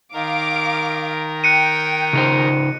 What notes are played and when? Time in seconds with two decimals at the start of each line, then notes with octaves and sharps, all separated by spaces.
0.14 D#3 A#4 F5 D6
1.44 G5 F#6 C#7 D#7
2.13 C#3 D#4 C5